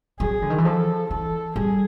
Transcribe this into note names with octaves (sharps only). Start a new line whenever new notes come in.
F#3 G#4
D3
D#3
E3
F3 A4
E3 A4
G3 G#4